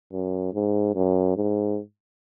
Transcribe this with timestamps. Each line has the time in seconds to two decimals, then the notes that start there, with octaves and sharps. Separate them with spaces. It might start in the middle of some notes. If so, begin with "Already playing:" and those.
0.13 F#2
0.54 G#2
0.95 F#2
1.36 G#2